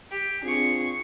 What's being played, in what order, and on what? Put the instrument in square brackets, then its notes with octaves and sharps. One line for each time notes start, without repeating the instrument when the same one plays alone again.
[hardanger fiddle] G4
[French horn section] C4 D4 F4 [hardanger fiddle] G#4 C#6